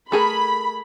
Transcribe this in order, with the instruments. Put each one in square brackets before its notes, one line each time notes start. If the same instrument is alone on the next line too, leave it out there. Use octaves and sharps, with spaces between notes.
[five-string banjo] A3 G#4 A#4 [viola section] B5